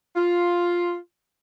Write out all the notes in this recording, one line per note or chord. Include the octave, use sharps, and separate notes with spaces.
F4